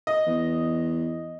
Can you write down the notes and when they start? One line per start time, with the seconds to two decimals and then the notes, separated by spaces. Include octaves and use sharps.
0.07 D#5
0.26 E2